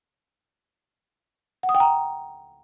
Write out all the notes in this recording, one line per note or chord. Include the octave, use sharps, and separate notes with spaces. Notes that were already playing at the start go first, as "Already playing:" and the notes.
F#5
D#6
G5
A#5